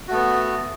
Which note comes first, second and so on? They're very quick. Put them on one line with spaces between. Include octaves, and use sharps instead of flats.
F#4 A3 B3